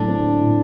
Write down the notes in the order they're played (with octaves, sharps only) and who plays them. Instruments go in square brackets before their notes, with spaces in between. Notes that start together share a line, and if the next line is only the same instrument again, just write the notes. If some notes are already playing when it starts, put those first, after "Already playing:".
Already playing: [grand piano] A2 F#3 A3 [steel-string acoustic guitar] D3 D4
[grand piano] C4
A3
A2